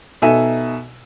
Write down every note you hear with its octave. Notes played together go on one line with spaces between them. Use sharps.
B2 D#4 A4 E5 G#5 D#7